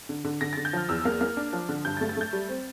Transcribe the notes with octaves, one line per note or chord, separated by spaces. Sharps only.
D3
D3
D3 A#6
D3 A6
G6
F3 F6
E2 E6
A#3 F6
A#3 F6
D4
F3
D3
G2 G6
A6
A3
A6
A3 G6
G3
C4